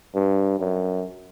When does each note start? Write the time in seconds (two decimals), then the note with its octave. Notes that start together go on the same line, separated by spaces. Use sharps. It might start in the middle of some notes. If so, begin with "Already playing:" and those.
0.15 G2
0.59 F#2